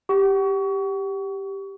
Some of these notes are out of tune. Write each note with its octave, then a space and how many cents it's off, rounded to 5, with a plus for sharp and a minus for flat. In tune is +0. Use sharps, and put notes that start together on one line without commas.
G4 +0 F#5 +40 C#6 +30